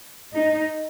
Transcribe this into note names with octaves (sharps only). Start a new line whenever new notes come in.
D#4